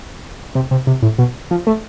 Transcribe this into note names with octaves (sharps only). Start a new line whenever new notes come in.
C3
C3
C3
A2
B2
F3
A3